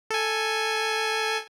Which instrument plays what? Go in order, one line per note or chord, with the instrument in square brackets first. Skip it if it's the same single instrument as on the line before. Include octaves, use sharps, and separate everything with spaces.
[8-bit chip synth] A4 G#5